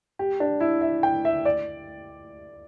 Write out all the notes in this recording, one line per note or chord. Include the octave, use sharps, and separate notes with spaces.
G4
D4
E4
E5
G5
E5
D5